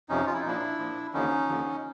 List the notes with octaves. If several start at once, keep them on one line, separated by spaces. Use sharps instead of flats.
F2 C3 F3 C#4 D#4
F4
E4
D#4
A#2 F3 D4 E4
A#2 F3
D#2 D3 F3 C#4 D#4
D#2 D3 F3